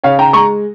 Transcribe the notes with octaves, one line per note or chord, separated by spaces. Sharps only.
C#3 C#5 F5
G5 A#5
G#3 A#5 C#6